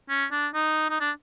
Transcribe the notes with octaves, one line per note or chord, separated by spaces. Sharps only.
C#4
D4
D#4
D#4
D4